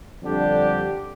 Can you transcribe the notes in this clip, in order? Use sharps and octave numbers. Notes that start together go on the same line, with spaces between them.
F2 D3 G3 D4 G4